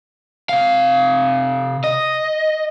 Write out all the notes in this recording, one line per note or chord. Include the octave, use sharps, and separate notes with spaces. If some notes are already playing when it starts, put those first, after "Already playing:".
C3 F5
D#5